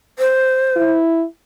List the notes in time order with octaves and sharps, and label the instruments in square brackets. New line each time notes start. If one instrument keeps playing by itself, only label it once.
[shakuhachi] C5
[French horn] E4